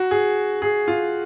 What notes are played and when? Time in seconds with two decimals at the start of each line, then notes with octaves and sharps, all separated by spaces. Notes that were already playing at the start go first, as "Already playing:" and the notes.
Already playing: F#4
0.11 G#4
0.62 G#4
0.88 F4